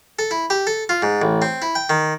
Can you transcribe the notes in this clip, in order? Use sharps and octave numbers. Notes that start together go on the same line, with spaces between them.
A4
E4
G4
A4
F4
G#2
A1
C4
E4
G5
D#3